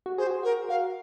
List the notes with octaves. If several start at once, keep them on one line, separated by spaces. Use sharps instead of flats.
F#4
G#4 C5
F#4
G#4
F#4 A#4
F#4 F5